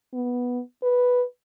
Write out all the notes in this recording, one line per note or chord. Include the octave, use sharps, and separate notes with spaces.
B3
B4